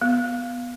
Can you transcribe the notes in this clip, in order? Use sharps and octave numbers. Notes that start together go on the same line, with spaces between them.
B3